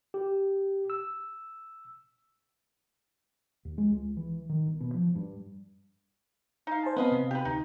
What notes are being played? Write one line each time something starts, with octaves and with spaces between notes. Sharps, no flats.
G4
E6
D#2
G#3
C#2
E3
D#3
G1
B2
F3
G2
D#4 F5
C5 G#5 A5
B3 C4 B4 D#5 F5
C3
G4 B4
D2 D#4